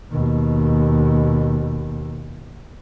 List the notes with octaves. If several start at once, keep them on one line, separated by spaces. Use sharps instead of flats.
D#2 B2